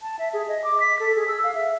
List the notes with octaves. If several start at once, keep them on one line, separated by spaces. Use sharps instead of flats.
A5
E5
G#4
D#5
D6
B6
A4
G#4
E6
F5
E5